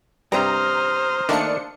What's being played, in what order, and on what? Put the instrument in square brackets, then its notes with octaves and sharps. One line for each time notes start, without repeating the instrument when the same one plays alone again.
[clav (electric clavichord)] G2 C3 G3 [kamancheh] C5 [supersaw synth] A#5 [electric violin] D#6 F6
[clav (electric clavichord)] D#3 A3 A#3 [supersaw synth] D4 C#7